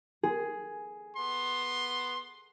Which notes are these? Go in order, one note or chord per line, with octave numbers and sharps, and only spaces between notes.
G#4
B3 C6